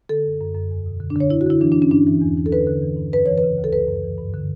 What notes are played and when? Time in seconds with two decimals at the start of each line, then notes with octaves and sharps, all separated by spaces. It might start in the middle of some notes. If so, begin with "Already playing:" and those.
0.09 D3 A4
0.26 F#2
0.41 F#2
0.55 F#2
0.71 E2
0.86 B2
1.00 D3
1.10 D4
1.16 D3 C#5
1.30 D3 E4
1.41 F#4
1.46 D3 E4
1.61 E3 D4
1.72 D4
1.77 G2
1.82 C#4
1.91 G2 D4
2.07 E3
2.21 E2
2.37 E3
2.46 A4
2.52 D3 B4
2.67 D3
2.82 E3
2.97 G2
3.13 F#2 B4
3.26 E3 C#5
3.38 B4
3.43 C#3
3.58 D2
3.64 A4
3.73 F#2 B4
3.88 F#2
4.04 E3
4.18 G2
4.34 D3